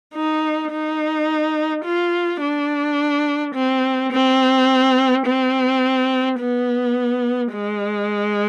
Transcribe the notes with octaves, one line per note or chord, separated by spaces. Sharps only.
D#4
D#4
F4
D4
C4
C4
C4
B3
G#3